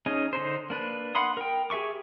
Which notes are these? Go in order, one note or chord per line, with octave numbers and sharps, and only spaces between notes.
C#4 D#4 G#4 D#5
D3 D#4 C5
A#3 D4 B4
F5 F#5 B5 C6 D#6
A#4 G5
G4 G#4 E5 C#6 D6